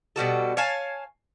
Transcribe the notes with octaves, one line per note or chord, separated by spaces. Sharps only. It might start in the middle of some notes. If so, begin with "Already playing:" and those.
B2 G3 F#4 A4
C#5 F5 G#5 A5